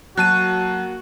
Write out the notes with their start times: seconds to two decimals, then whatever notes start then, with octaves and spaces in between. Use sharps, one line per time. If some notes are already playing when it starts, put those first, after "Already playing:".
0.17 F#3 A#3 F#4 A5 F#6 D#7